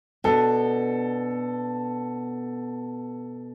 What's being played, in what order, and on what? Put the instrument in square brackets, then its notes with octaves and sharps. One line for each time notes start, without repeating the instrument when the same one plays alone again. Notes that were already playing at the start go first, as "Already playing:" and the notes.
[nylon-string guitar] B2 B3 D4 [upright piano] A4